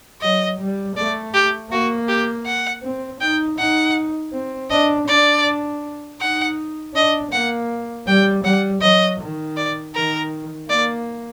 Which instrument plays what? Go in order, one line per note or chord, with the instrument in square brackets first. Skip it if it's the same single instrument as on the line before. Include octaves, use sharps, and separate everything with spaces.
[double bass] F#3 [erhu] D#5
[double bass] G3
[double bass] A3 [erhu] D5
[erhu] G4
[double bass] A#3 [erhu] F#4
[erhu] G4
F#5
[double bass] C4
[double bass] D#4 [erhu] G5
[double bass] D#4 [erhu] F#5
[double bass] C4
[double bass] D4 [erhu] D#5
[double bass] D4 [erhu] D5
[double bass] D#4 [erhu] F#5
[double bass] D4 [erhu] D#5
[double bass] A#3 [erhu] F#5
[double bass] G3 [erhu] G5
[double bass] G3 [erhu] F#5
[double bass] F#3 [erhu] D#5
[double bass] D#3
[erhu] D5
[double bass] D#3 [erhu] A#4
[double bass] A#3 [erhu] D5